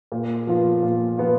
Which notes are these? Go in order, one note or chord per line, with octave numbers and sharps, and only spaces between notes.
A#2
F3 B3 F4
A#2
F3 B3 F4